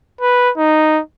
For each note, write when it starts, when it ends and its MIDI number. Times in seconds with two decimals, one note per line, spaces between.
0.21 0.50 71
0.57 1.00 63